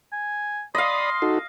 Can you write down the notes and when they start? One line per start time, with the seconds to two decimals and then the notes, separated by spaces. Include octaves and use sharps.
0.13 G#5
0.75 D5 D#5 F5 B5 C6 D#6
1.22 D#4 F#4 A4